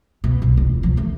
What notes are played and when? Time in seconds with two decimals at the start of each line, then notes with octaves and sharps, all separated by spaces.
0.24 B2
0.42 B1
0.57 E1 C#2
0.83 F3
0.97 D#2 A3